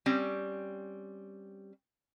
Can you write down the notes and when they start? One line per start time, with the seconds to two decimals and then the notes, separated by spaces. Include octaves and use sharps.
0.06 G3 C4 C#4